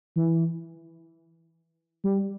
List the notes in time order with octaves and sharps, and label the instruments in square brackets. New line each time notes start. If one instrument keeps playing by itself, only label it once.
[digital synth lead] E3
G3